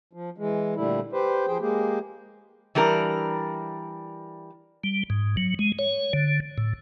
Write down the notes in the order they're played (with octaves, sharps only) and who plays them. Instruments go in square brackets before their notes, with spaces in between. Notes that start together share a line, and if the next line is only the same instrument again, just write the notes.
[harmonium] F3
E3 G#3
A#2 D3 G3 A3 E4
G4 B4 C5
F3 G#4 C5 G5
G#3 A#3 G4 G#4
[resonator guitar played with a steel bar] E3 G3 D4 A#4
[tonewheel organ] G3
G#2
F#3
G#3
C#5
D3
A2